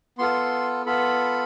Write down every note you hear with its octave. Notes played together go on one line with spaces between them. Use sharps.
B3 F4 A4 C6
B3 F4 A4 B5